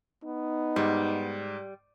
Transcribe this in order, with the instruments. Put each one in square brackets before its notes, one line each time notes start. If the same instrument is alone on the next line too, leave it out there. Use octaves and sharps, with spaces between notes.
[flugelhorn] B3 [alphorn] D#4
[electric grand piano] G#2 [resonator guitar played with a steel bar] G3